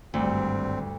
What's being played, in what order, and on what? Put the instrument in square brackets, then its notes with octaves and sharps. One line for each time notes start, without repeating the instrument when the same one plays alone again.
[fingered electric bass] G#1 [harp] D2 [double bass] G2 G3 [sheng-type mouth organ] C4